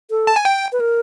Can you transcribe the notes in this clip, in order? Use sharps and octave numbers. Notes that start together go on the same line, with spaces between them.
A4
A5
G#5
G5
B4
A#4